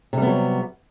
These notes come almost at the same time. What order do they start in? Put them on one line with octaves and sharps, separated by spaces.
C3 G3 B3 F#3